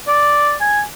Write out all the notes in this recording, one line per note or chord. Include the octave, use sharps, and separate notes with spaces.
D5
G#5